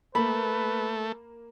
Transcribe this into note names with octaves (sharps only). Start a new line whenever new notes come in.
A3 A#3 B4 B5